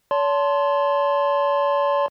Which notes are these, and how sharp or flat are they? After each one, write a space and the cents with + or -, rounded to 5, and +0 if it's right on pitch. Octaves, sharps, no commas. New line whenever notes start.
C#5 +45 A5 +0 C6 +0